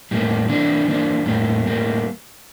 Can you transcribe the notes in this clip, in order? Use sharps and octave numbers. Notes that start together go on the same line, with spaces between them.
A2 G3 A#3
E3 A#3 D4
E3 A#3 D4
A2 G3 A#3
A2 G3 A#3